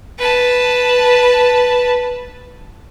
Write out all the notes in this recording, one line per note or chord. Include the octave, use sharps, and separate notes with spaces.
B4 A5